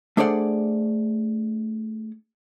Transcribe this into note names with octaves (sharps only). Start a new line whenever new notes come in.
A3 D4 G#4 C5 D5 F#5